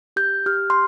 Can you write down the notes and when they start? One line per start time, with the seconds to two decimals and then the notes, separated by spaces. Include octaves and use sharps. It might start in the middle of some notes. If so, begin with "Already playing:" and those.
0.16 G4 G6
0.46 G4 F6
0.70 C6